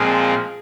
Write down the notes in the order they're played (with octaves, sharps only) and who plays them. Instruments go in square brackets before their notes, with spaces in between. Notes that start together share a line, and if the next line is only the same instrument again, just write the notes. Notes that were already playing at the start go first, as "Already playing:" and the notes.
Already playing: [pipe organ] A#2 F3 G#3 C4 [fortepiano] G#4